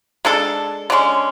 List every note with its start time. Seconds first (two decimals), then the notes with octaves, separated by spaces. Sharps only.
0.25 G#3 D4 A4
0.90 D3 G#3 C#4